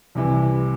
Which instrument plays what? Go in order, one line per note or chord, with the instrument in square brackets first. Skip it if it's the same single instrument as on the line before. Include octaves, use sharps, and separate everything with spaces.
[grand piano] C2 C3 E3